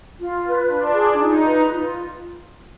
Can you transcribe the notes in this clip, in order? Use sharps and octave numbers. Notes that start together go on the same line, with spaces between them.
F4
B4
D4 F4
G#4
D#4 F4
B4
F4